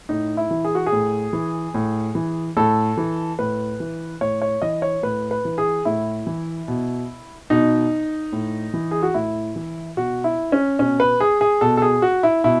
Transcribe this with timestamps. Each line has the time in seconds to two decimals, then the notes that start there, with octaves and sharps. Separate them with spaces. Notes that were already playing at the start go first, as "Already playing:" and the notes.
0.09 A2 D#4
0.37 E4
0.51 E3
0.65 G#4
0.75 F#4
0.86 G#4
0.92 A2
1.33 E3
1.74 A2
2.15 E3
2.57 A2 A4
2.97 E3
3.39 A2 B4
3.80 E3
4.21 A2 C#5
4.42 C#5
4.62 E3 D#5
4.82 C#5
5.03 A2 B4
5.31 B4
5.45 E3
5.58 G#4
5.85 A2 E4
6.27 E3
6.68 B2
7.50 B2 D#4
8.32 A2
8.74 E3
8.91 G#4
9.03 F#4
9.14 A2 E4
9.56 E3
9.97 B2 F#4
10.24 E4
10.52 C#4
10.79 B2 C#4
11.00 B4
11.20 G#4
11.41 G#4
11.61 B2 A4
11.77 A4
11.82 G#4
12.02 F#4
12.23 E4
12.44 B2 E4